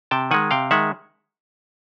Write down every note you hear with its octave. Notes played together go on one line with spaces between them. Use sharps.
C3 G5 A5
D#3 G#3 F#5 G#5
C3 F5 G5
D#3 G#3 E5 F#5